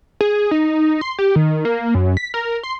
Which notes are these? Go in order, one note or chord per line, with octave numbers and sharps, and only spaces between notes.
G#4
D#4
C6
G4
D#3
A#3
F#2
B6
A#4
C6